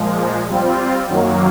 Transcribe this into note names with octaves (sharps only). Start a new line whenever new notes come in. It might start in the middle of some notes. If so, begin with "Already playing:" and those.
Already playing: A#2 F3 G#3
G3 C4 F4
F#2 D#3 F#3 A#3